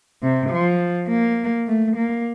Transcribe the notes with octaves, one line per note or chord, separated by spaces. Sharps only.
C3
F3
A#3
A3
A#3